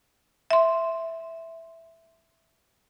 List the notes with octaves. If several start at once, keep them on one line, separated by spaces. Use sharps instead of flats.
E5 C6